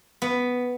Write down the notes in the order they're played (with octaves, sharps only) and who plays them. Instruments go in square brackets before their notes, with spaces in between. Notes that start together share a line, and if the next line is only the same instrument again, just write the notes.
[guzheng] B3